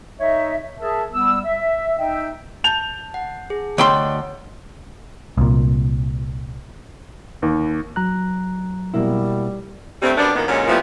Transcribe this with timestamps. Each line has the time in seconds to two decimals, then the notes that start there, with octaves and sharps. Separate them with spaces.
0.20 D#4 C#5 D#5 E5
0.80 G#4 A#4 E5 A5
1.13 G3 B3 E6
1.45 E5
1.98 D#4 D#5 E5 G5
2.64 A5 G6 F7
3.14 F#5
3.50 G#4
3.78 D2 C#5 D#5 G5 C6 C#6
5.38 C2 A#2
7.42 D#2
7.96 F#3 A#5 F#6
8.94 B2 G3 A#3 E4
10.02 G2 C3 G3 A3 C4
10.17 F#2 G3 B3 D4
10.35 F#2 A#2 D#3 A#3 B3
10.48 F#2 A#2 D3 G#3 C#4
10.68 A#2 E3 F3 G3 A3 B3